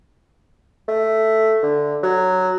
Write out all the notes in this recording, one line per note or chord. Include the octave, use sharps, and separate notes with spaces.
A3
D3
F#3